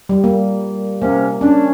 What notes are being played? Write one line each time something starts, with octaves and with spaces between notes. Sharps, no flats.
G3
A#3
C3 A#3 C#4
C#4 D4